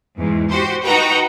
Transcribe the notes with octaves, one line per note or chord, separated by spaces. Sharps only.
E2 G#2
F#4 G4 C5
D#4 F#4 B4 F#5 G5 A#5